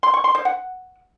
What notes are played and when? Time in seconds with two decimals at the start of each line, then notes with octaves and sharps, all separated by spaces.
0.03 C6
0.14 C#6
0.24 C6
0.35 C5
0.45 F#5